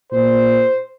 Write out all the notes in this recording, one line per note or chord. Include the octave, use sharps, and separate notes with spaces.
A#2 C5